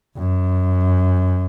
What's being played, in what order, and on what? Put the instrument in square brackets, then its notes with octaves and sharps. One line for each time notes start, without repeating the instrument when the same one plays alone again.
[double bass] F#2